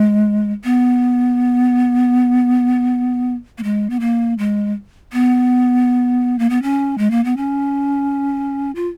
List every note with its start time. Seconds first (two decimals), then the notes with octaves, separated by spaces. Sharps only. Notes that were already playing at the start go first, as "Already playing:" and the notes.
Already playing: G#3
0.64 B3
3.58 A#3
3.64 G#3
3.90 B3
4.00 A#3
4.38 G#3
5.13 B3
6.39 A#3
6.50 B3
6.63 C#4
6.98 G#3
7.11 A#3
7.24 B3
7.37 C#4
8.75 F4